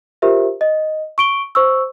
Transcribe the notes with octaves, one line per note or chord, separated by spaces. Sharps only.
F4 G4 A#4 C5 E5
D#5
C#6 D7 G7
C5 C#6 E6